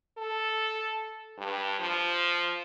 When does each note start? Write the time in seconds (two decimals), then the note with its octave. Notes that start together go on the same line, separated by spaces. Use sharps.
0.18 A4
1.39 G2
1.80 F3